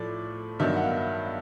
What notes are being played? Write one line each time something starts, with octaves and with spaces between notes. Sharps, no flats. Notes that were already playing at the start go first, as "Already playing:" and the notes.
Already playing: A2 F3 A3 D5
G2 D#3 F#3 B3 D4 E5
F#5
F5